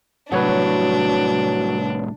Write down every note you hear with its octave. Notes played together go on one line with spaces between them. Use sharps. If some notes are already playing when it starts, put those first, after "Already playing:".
C2 A2 F#3 D4 B4 C#5 F#5